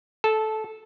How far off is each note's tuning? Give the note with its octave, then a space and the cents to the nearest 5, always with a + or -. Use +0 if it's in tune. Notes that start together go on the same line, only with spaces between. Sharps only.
A4 -15 A5 +0